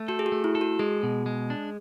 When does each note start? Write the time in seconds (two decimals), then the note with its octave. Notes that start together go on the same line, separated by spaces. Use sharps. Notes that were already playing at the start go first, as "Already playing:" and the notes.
Already playing: A3
0.08 F#4 A4
0.19 G#4
0.26 F#4
0.32 A3
0.44 E4
0.55 A4
0.61 F#4
0.79 G#3 G#4
1.03 B2
1.26 G#3
1.50 D4